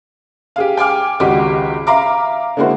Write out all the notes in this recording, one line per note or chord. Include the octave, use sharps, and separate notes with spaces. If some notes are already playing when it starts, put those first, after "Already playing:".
G4 G#4 F5
G5 G#5 D6 F6
G#1 C#2 F#4 G4 D#5 D6
E5 F5 A#5 D6
D3 G#3 A#3 E4 F#4 C5